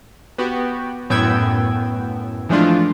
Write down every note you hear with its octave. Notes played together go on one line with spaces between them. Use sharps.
B3 F#4 G4
F#2 A2 B3 G5 E6 G#6
E3 F3 G#3 A3 D4 F4